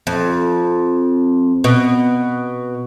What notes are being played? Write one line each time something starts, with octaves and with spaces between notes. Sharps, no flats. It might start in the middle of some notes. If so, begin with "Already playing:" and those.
F2
B2